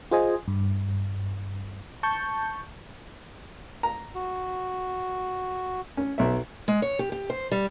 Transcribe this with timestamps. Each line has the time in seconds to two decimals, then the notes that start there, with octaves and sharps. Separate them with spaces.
0.11 F4 G#4 C5 D#5 G#5
0.48 G2
2.03 A5 C#6 G6
3.83 A#5
4.15 F#4
5.97 C#4
6.18 B1 E5
6.68 G#3
6.82 C#5
6.99 G4
7.12 G4
7.30 C5
7.52 G3